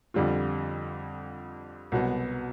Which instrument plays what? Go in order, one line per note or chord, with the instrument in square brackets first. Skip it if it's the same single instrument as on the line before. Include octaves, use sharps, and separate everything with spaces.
[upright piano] F2 D3 G3 C4 F4
C2 B2 F#3 B3